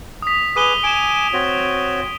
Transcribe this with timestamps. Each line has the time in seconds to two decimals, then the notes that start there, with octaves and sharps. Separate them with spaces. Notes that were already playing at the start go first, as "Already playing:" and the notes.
0.22 D#6 B6
0.56 G#4 B4 D6 D#6 D#7 G7
0.84 G#5 D6 D7 E7
1.33 C4 F#4 C#5